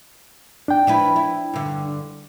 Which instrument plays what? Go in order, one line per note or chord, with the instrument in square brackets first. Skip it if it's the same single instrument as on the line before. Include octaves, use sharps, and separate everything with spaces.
[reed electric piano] D4 G5
[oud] F3 E4 B4
E4
G2 D3